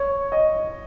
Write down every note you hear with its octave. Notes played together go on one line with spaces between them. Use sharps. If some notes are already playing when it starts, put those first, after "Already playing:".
Already playing: C#5
D#5